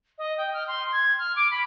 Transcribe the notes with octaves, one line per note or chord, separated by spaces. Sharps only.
D#5
G5
F6
C6
G#6
F6
D6
B5